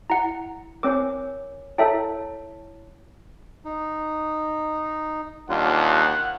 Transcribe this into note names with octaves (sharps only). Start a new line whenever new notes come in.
E4 F#5 A#5
C4 A#4 C#5 G#5 D6
E4 A4 C#5 E5 G5 A5
D#4
D#2 G3 D4 F4 F#5